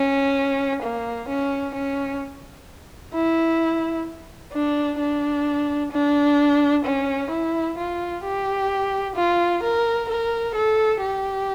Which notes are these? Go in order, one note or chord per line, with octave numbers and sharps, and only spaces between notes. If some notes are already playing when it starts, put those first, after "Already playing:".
Already playing: C#4
A#3
C#4
C#4
E4
D4
D4
D4
C#4
E4
F4
G4
F4
A#4
A#4
A4
G4